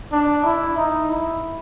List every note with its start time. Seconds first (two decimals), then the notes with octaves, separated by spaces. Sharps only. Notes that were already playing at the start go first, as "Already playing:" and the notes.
0.12 D4
0.44 E4
0.77 D#4
1.09 E4